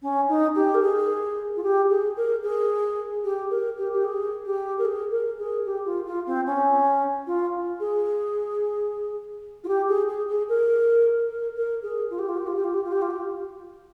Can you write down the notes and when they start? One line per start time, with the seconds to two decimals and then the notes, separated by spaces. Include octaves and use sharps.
0.02 C#4
0.29 D#4
0.55 G4
0.74 A#4
0.82 G#4
1.56 F4
1.63 G4
1.90 G#4
2.17 A#4
2.43 G#4
3.24 G4
3.50 A#4
3.78 G4
3.93 G4
4.04 G#4
4.45 G4
4.78 A#4
4.85 G#4
5.11 A#4
5.39 G#4
5.65 G4
5.86 F4
6.06 F4
6.27 C4
6.46 C#4
7.27 F4
7.80 G#4
9.64 F4
9.68 G4
9.88 G#4
10.08 G#4
10.29 G#4
10.49 A#4
11.29 A#4
11.57 A#4
11.83 G#4
12.10 F4
12.19 G4
12.29 F4
12.37 G4
12.47 F4
12.56 G4
12.64 F4
12.74 G4
12.84 F4
12.92 G4
13.02 F4
13.10 G4